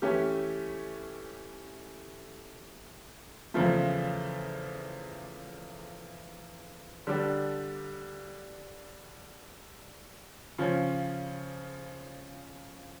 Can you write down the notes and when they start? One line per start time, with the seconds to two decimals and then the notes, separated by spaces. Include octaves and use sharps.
0.02 E3 A3 C#4 G4
3.54 E2 C#3 F3 A3
7.07 D3 G3 D4 G4
10.58 C#3 F3 C#4